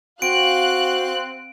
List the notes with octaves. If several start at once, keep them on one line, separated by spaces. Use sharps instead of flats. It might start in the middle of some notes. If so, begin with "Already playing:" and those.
C4 F#4 F5 F#6 D7